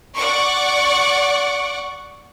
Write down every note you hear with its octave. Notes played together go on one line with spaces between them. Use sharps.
D5 F#5 C#6 D6